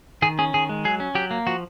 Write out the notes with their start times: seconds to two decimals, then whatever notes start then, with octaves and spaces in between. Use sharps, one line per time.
0.22 D#3 G#4
0.39 C#4 G#4
0.54 D#3 G#4
0.69 G#3
0.85 F#3 G#4
1.00 C#4
1.15 F#3 G4
1.31 A#3
1.46 F3 F#4